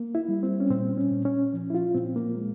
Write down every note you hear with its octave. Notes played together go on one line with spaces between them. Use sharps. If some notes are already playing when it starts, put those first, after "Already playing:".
Already playing: A#3
E4
G3
C4
C#4
A#2 C4
C#4
A#2
C#4
F3
E4
F4
A#2 C4
A#3
G#3